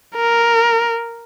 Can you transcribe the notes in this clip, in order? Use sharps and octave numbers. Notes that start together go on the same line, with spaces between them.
A#4